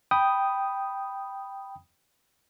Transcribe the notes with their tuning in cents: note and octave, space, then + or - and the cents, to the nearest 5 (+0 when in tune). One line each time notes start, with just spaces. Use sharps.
G5 +0 B5 +0 D#6 +0